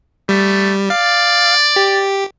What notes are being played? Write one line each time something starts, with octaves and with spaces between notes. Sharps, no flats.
G3 A3
D5 F5
G4